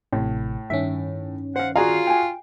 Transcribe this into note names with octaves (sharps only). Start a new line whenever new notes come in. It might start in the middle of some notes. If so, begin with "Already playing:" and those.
A1 A2 C3
G2 D#3 C#4 E5
C5 F5 F#5
F4 F#4 G#4 D5 F5 A#5
G5 G#5